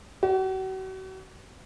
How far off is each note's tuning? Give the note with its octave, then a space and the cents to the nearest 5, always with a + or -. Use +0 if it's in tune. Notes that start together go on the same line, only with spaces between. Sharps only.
F#4 +40